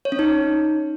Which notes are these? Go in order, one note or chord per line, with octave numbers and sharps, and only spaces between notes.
C#5
C#4
D#4